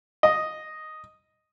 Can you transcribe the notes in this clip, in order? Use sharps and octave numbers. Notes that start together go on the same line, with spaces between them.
D#5